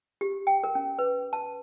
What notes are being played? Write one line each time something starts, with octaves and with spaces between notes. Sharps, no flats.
G4
G5
A#4
C#4
B4
A5